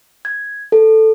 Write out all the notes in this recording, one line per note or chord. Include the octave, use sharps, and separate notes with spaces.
G#6
A4